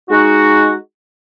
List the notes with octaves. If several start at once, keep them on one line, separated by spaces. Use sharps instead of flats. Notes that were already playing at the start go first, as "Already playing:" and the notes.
G#3 D#4 F#4